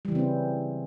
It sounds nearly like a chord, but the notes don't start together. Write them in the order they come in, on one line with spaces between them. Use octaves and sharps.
G3 E3 C#3 C4 C#4